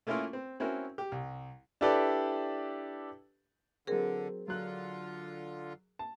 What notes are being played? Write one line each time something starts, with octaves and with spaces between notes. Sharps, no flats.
A3 A#3 C#4 E4 F4 A#4
C4
C4 C#4 E4 F#4 A#4
G4
C2
D4 E4 G4 A4 B4 D5
D3 F#3 C4 G#4 A#4
D3 F#3 F4 F#6
A5